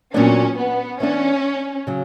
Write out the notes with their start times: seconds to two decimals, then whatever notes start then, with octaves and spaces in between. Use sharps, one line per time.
0.14 A#2 F#3 B3 C#4 D4
0.57 B3
1.00 E3 B3 C#4 D4
1.87 C#3 F#3